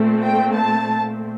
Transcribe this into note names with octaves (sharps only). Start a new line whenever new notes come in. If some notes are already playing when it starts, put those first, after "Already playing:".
Already playing: A#2 A3 C4
G5
A5